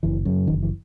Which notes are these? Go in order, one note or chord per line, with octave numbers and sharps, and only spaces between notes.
F#1 E3
F#2 C#3
F#1 D#3
E3